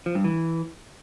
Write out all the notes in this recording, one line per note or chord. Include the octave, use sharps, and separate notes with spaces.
F3
G2
E3